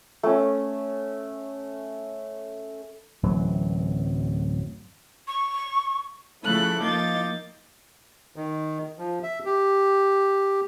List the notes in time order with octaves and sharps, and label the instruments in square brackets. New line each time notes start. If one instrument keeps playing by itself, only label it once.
[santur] A3 C#4
[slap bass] D1 F#2 E3 F#3
[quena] C#6
[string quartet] C#3 F3 A3 E4 A4 F#6
F3 A#3 D#4 D6 G6 A6
[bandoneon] D#3
F3
E5
G4